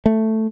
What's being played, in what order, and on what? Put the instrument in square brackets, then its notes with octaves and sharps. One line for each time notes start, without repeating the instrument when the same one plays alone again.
[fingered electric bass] A3